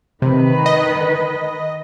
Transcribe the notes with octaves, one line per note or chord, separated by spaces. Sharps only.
C3 D#3 B4
D#5